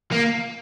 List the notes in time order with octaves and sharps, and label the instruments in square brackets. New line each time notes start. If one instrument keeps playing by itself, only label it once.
[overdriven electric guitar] A#3